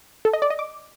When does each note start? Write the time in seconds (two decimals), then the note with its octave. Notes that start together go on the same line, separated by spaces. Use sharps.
0.25 A4
0.33 D#5
0.42 D5
0.50 D#5
0.59 D6